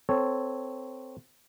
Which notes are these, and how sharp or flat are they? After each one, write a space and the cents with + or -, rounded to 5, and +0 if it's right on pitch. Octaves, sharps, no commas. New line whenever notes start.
C4 -15 A4 +0 C#5 -5